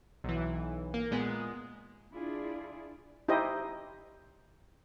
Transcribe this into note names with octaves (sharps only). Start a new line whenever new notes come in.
B1 E3
A#3
A#2 G#3 B3
D4 E4 F4 G#4 D5
D#4 E4 G4 C5 D#5